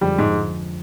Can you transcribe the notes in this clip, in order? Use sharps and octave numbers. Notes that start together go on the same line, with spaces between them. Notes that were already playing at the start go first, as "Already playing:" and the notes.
F2 D3 G3 G#3
G#2